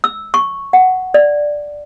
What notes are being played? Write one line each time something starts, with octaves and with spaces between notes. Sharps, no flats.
E6
C#6
F#5
D5